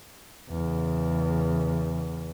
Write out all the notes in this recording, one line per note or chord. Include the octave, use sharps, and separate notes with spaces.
E2 C#3